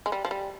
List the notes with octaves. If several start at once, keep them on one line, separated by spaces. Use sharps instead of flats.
G#3
G3
F3
G3